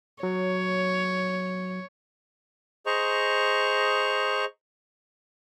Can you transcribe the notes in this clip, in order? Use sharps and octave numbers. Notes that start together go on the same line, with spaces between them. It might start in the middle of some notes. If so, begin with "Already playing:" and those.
F#3 C#5
G#4 C5 D#5 A#5 C#6